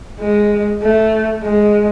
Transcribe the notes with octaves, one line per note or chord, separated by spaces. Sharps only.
G#3
A3
G#3